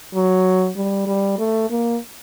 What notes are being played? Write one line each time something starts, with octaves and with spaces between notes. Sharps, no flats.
F#3
G3
G3
A3
A#3